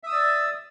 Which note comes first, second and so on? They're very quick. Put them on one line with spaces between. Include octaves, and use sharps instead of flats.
E5 D#6 E6 D5